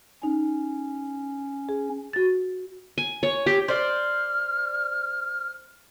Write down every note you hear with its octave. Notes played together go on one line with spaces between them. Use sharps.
C#4 D#4
G#4
F#4 A6
G#5
C#5
G4
C5 D5 F6